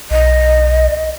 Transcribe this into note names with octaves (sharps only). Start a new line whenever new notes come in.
B1 D#5